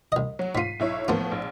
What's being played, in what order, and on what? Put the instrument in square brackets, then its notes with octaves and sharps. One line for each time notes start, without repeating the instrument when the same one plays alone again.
[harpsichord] C2 D#5
[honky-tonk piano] F#3
[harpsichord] G#2 F4 [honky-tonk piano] B6 C7 D#7
[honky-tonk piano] B1 E4 C#5
[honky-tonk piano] A2 F3 B3 [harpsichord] A#3 F4
[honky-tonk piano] A#1